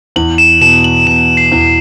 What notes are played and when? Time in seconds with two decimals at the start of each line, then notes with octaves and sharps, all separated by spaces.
0.16 E2 F#7
0.38 E7
0.61 B2 E7
0.84 F#7
1.07 B2 E7
1.37 C7
1.52 E2